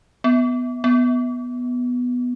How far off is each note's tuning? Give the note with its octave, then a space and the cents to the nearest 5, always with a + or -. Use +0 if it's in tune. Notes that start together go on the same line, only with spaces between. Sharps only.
B3 +5
B3 +0